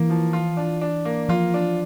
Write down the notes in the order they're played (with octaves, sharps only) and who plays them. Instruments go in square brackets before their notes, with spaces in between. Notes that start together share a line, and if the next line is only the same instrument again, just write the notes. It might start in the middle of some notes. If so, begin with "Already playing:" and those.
Already playing: [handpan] E3 [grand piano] A#3
[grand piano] F3
F4
D4
D4
A#3
[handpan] F3 [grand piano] F4
[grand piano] D4